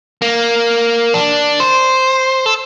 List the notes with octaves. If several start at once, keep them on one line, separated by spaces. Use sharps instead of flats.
A#3
D4
C5
A4